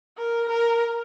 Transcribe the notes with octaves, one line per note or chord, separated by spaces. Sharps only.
A#4
A#4